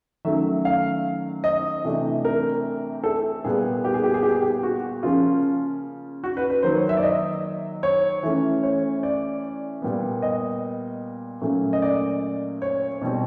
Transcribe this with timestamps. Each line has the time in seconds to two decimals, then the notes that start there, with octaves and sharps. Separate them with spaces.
0.25 D#3 F#3 A3 C#4 E5
0.65 F5
1.44 D#5
1.85 C3 E3 A3 D4
2.25 A#4
3.04 A4
3.44 A#2 G3 B3 G#4
3.84 G4
3.94 G#4
4.04 G4
4.14 G#4
4.23 G4
4.33 G#4
4.42 G4
4.63 F#4
5.03 C#3 F3 A#3 C#4 F4
6.24 F#4
6.37 B4
6.50 B4
6.63 D#3 F#3 A#3 C5
6.77 C#5
6.89 E5
6.97 D5
7.03 D#5
7.83 C#5
8.23 E3 A3 C#4
8.63 C#5
9.03 D5
9.82 A#2 G3 B3
10.22 D#5
11.42 A#2 F#3 A3 C#4
11.73 D#5
11.82 D5
12.62 C#5
13.02 B2 G3 C4